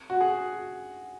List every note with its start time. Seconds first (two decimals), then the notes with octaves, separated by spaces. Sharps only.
0.10 F#4
0.21 G#4